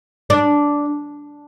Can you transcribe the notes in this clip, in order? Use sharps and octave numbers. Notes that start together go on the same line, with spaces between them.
D4